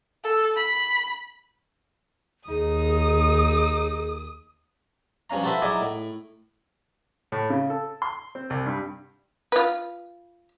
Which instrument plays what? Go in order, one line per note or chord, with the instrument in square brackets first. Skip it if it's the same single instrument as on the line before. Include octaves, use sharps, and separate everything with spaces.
[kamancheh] A4
B5
[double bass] D#2 [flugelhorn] D#4 [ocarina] G#4 [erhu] D#6
[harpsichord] G2 F3 C#4 F5 A#5
F4 F#4 A4 B4 C5 E5
F#3 D#4 E4 G#4 D5 D#5
A2
[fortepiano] A2
C#3
A4
C6
C4
C2
G2
[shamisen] F4 B4